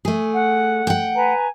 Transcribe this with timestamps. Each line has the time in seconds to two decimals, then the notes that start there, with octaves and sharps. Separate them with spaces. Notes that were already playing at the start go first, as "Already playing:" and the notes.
0.05 A3 G#4
0.33 F#5
0.87 F#5 G5
1.15 B4 G#5 A#5